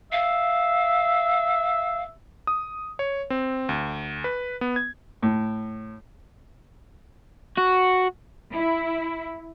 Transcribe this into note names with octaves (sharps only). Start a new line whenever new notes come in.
E5 F5
D#6
C#5
C4
D2
B4
B3
G#6
A2
F#4
E4